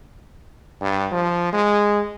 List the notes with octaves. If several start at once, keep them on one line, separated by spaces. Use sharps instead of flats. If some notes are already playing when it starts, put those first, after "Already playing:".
G2
F3
G#3